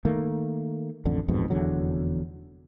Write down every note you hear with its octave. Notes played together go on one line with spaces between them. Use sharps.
D#3 A3 A#3
A1 F2 D3
A1 F2 G#2 B2
F1 E2 D3 F#3